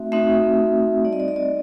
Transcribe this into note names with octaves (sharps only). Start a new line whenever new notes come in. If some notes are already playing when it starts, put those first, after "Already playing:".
Already playing: A3 C4 D#4 F#4 E5
A3 C4 D#4 F#4 E5
G3 C4 D#4 D5
D#5
D5
D#5
D5